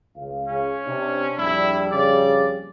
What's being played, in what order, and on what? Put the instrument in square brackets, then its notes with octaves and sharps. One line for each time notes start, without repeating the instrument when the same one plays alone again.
[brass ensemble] C#2 F5
[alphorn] C#3 [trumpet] C#4
[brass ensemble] C3 [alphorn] D4
[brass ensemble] A#1 F2 G3 [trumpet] E4
[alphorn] C#3 [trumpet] D5